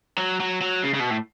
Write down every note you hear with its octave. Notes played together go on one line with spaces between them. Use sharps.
F#3
F#3
F#3
C#3
C#3
B2
A2